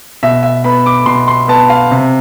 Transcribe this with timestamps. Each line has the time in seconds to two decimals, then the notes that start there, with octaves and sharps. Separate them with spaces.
0.23 B2 E5
0.43 E5
0.64 B3 B5
0.86 D6
1.06 B2 C6
1.28 C6
1.48 B3 A5
1.69 F5
1.91 C3